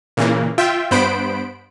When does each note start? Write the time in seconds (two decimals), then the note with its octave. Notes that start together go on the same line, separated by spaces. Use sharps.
0.17 A#2 C#3 E3 A#3
0.58 F4 E5 G5
0.91 G2 B3 C5 B5 D7